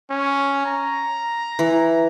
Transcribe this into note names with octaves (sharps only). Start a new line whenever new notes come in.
C#4
A#5
E3